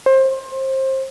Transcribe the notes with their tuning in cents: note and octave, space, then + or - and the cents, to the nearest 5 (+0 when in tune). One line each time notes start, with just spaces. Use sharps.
C5 +25